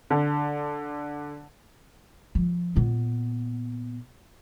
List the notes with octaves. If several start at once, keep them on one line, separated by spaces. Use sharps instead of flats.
D3
F3
A#2 B3